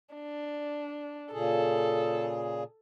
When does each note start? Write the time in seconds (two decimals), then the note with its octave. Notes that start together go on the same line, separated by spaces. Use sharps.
0.15 D4
1.32 A#2 C#3 G#4 A4